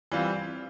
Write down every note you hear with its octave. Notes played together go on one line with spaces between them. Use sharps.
E3 G3 C4 F4